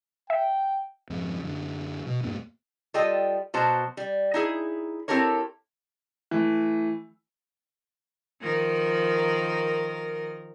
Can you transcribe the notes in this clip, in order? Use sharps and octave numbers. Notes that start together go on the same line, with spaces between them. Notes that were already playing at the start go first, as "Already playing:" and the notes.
E5 G5
F2 G#2 C#3
F#2 D3
B2
E2 G2 A#2 A#3
G3 F4 A4 D#5 G5
B2 F#3 C5 A5
G3
D#4 E4 G#4
C4 E4 G4 A4 A#4 C#5
E3 A3
D#3 F3 A#4